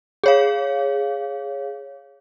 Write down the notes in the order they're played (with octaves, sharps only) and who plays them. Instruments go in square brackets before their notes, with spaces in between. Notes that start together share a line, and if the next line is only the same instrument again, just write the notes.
[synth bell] G#4 C#5 F5